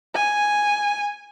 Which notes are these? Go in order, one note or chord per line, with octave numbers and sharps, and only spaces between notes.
G#5